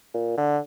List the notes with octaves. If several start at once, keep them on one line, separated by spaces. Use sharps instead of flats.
A#2
D3